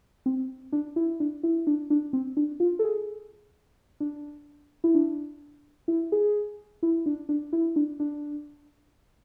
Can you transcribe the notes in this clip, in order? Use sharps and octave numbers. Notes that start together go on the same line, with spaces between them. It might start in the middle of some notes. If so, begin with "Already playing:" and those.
C4
D4
E4
D4
E4
D4
D4
C4
D4
F4
A4
G#4
D4
E4
D4
E4
G#4
E4
D4
D4
E4
D4
D4